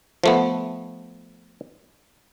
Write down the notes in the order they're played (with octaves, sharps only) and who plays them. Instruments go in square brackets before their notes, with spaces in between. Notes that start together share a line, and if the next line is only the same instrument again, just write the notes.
[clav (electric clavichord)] F3 A3 B3